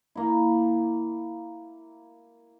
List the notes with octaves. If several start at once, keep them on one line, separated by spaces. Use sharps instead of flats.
A#3 E4